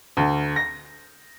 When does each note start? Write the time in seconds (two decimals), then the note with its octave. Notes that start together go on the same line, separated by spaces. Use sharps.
0.17 D2
0.56 A#6